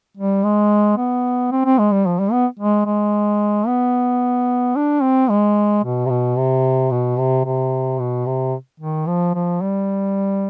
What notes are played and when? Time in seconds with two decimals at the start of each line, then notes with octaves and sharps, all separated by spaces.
0.17 G3
0.44 G#3
0.97 B3
1.52 C4
1.65 C4
1.79 G#3
1.92 G3
2.06 F3
2.19 G3
2.32 B3
2.59 G#3
2.86 G#3
3.67 B3
4.76 D4
5.02 C4
5.30 G#3
5.84 B2
6.06 C3
6.10 B2
6.38 C3
6.91 B2
7.19 C3
7.45 C3
7.99 B2
8.26 C3
8.80 D#3
9.07 F3
9.35 F3
9.62 G3